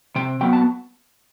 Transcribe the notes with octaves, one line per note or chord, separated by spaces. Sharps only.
C3 G5
F#3 B3 G5
A5